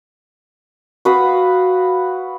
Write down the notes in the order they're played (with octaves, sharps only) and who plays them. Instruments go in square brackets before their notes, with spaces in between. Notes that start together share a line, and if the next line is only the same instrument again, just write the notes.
[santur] F#4 B4 F5 D#6